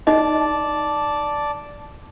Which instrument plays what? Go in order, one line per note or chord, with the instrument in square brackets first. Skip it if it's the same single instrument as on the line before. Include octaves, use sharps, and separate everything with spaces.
[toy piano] D#4 D#5 [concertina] D5 A5